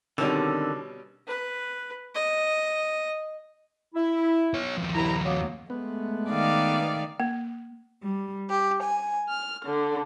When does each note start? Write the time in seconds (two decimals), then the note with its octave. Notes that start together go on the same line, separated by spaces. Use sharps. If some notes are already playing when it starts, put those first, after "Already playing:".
0.18 B2 D3 D#3 G3 C4 C#4 F#4 E6
1.27 B4
2.15 D#5
3.94 E4
4.54 B3 C#5
4.78 D#2 F3
4.94 C2 E4 A#5
5.24 F#3 A#3 B3
5.70 G#3 A3 B3
6.30 D#3 D5 F5
7.20 A#3
8.04 G3
8.49 G4
8.83 G#5
9.29 F6
9.65 D3